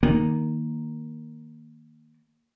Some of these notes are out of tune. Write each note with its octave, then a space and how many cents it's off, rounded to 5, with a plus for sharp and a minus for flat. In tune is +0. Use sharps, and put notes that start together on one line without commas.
D#3 +0 A#3 +0